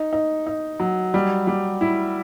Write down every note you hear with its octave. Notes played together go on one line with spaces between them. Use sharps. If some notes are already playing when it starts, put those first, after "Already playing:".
Already playing: D#4
D#4
D#4
F#3
G3
G3
E4